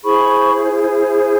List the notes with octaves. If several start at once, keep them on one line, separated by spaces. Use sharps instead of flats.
E4 G#4 C5 B5 C#6